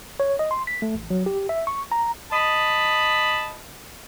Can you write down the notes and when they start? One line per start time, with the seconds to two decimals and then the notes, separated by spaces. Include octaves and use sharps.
0.20 C#5
0.39 D#5
0.51 C6
0.67 B6
0.82 A3
0.95 A1
1.10 F#3
1.26 G4
1.49 E5
1.67 C#6
1.92 A#5
2.31 D#5 A5 B5